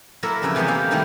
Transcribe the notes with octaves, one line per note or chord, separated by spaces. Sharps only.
F#3 A#3 E4 A4 A#4 E5
F2 C#3 B4 E5
F#2 C3 E3 G#3 B3
A#3 G4 A4 F5
C3 D#3 G3 A3 E4